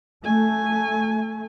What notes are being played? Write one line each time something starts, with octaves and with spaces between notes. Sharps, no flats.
A3 G#5